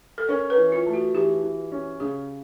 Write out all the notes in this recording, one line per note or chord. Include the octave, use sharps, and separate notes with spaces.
A4
C#4 A#4
B4
E3
F4
A3
F#4
E3 G4
E3
C#4
C#3 G#4